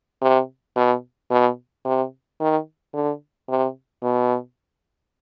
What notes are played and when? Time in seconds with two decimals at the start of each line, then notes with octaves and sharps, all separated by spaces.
0.22 C3
0.76 B2
1.31 B2
1.85 C3
2.40 D#3
2.94 D3
3.49 C3
4.03 B2